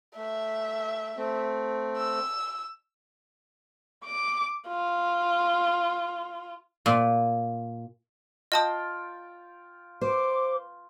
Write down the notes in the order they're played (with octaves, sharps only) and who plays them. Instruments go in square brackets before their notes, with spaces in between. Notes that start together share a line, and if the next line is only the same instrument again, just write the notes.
[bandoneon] A3 [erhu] E5
[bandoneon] A3 C4
[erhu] E6
[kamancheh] D6
F4
[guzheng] A#2
[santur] F4 G5 [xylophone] D#5 A5 D#6
[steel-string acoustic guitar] C5 [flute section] D6